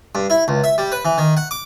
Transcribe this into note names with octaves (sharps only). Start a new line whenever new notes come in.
G2
E4
C#2
E5
G3
B4
E3
D#3
F#5
D6